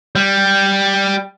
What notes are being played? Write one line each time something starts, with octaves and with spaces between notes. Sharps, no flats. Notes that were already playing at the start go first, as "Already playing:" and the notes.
G3